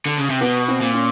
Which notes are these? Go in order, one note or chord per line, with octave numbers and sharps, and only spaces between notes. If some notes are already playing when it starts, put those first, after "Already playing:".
D3
C#3
C3
B2 B3
C4
A#2
C#4